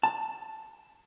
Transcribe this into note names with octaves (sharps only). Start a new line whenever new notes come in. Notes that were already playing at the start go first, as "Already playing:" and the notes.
A5